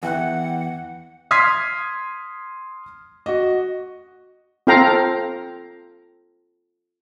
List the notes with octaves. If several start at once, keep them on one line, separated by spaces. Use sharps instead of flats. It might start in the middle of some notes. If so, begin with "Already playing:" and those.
E2 E3 F#5 G5 F#6
C6 D#6 F6 G#6 B6 C7
F#4 D#5
C4 F4 A4 F5 G5 A#5